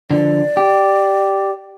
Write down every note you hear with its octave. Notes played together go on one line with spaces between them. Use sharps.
D3 F3 D5
G4